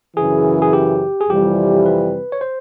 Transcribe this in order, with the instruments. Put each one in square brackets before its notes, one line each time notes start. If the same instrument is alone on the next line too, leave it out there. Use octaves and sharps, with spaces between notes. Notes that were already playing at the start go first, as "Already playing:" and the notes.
[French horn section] F#2 C#3 E3 [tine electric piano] G#4
[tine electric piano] G#4
G4
G#4
[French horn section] F2 C3 E3 G3 [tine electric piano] G4
[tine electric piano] B4
C#5
C5